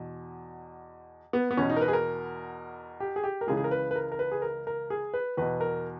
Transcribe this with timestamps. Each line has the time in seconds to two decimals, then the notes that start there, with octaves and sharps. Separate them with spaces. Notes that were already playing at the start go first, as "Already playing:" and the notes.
Already playing: E2 B2
1.33 B3
1.51 B3
1.57 E2 B2 C#4
1.70 D#4
1.76 A#4
1.81 B4
1.88 G#4
1.93 A#4
3.00 G4
3.16 G#4
3.24 G4
3.41 A#4
3.47 C#2 C#3 E3 G#4
3.57 G#4
3.64 A#4
3.71 B4
3.91 B4
3.96 A#4
4.12 A#4
4.19 B4
4.32 G#4
4.42 A#4
4.67 A#4
4.90 G#4
5.14 B4
5.37 E2 B2 B4
5.61 A#4